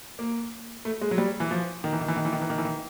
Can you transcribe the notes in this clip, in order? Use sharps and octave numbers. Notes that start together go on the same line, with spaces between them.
A#3
A3
G#3
F#3
G3
E3
F3
D#3
E3
D#3
E3
D#3
E3
D#3
E3
D#3
E3
D#3